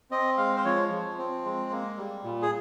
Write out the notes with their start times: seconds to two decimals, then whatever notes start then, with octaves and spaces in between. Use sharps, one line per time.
0.11 C4 D#5
0.37 G#3 F5
0.56 C5
0.65 F3 C#5
0.91 F3
1.18 C4
1.44 G#3
1.71 A#3
1.98 G3
2.24 A#2
2.42 G#4